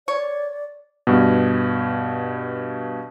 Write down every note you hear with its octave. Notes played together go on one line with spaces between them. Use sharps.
C#5 D5
G2 B2